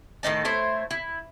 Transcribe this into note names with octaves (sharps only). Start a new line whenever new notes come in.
A2 D#3 D#4 A5
A3 E4 C5 C#5
E4